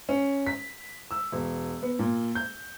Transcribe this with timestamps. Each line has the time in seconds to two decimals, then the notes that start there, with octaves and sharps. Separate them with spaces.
0.09 C#4
0.47 B6
1.11 E6
1.32 E1
1.83 B3
1.99 A#2
2.35 G6